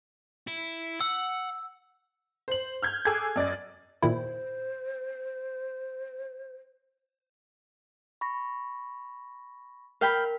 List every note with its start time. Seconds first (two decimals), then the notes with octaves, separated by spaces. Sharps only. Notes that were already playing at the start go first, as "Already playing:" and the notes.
0.47 E4
1.01 F#5 E6
2.48 C5 F#7
2.82 F6 G6 G#6
3.05 G#4 A4 D6 E6 F#6 G#6
3.36 F#2 D5 D#5 A6
4.02 A#2 D#3 E4 C5
8.21 B5 C#6 A#6
10.01 A#4 F5 G5 B5